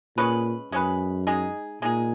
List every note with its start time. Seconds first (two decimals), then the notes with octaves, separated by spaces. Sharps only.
0.17 A#2 G#3 C#4 G#4 B4
0.72 F#2 G#3 C#4 G#4 B4
1.27 G#3 D#4 G#4
1.82 A#2 G#3 D#4 G#4